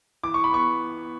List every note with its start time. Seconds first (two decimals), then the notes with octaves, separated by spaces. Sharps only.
0.23 E3 D6
0.34 C#6
0.44 B5
0.53 B3 C#6